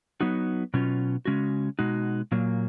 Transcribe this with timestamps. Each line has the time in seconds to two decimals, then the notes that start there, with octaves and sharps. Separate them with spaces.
0.21 F#3 B3 D#4 F#4
0.74 B2 F#3 C#4 F4
1.25 C#3 G#3 C#4 F#4
1.79 B2 G#3 D#4 F#4
2.32 A#2 F#3 A#3